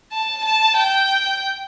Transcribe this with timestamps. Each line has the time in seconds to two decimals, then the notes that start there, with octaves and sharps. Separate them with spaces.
0.13 A5
0.45 A5
0.77 G5